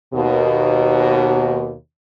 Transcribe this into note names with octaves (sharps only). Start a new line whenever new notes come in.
D#2 B2